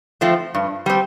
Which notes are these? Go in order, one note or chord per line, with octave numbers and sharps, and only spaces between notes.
F3 A3 C4
G2
G3 C4